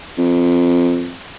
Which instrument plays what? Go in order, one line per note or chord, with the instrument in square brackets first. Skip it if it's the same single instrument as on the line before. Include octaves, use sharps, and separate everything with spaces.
[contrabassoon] F2